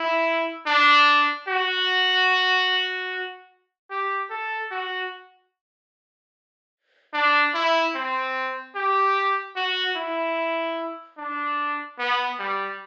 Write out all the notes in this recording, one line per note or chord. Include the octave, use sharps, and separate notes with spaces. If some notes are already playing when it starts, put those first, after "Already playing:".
Already playing: E4
D4
F#4
G4
A4
F#4
D4
E4
C4
G4
F#4
E4
D4
B3
G3